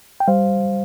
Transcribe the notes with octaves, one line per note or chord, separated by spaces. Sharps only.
G5
G3 C5 F5